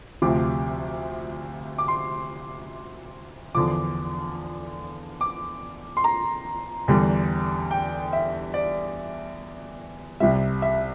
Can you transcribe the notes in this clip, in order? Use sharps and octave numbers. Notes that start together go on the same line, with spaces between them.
D2 C3 F3 D6
D6
C6
E2 D3 F3 D6
D6
C6
A#5
E2 D3 G3
G5
E5
D5
C2 C3 G3 E5
E5